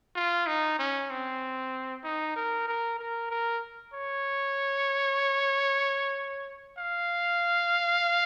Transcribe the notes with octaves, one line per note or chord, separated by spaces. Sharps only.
F4
D#4
C#4
C4
D#4
A#4
A#4
A#4
A#4
C#5
F5